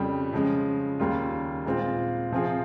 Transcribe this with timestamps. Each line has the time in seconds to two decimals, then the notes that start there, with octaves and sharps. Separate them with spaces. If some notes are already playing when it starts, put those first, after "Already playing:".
Already playing: F2 C#3 G3
0.33 C#3 F3 G#3
1.00 D#2 C#3 G3 A#3 F4
1.66 A#2 G#3 C4 F4
2.31 C3 F3 C4 F4 G#4